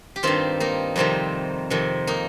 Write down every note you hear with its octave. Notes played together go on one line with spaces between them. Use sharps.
G4
G2 D#3 C4 F4
A#3 D#4
F2 C3 D#3 G3 C4
F2 C3 D#3
A#3 D#4